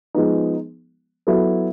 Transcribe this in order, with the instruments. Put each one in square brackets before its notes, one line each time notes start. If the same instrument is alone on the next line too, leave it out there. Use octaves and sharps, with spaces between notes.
[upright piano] F3 G#3 B3 D#4
F#3 B3 E4 A4